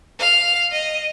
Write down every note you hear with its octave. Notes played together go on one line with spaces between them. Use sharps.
F5
D#5